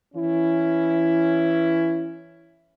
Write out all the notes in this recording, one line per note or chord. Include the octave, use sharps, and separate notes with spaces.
E3 C#4 E4